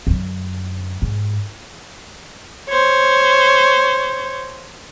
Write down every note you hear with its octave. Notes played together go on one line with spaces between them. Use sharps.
F#2 D3
G#2
C5 C#5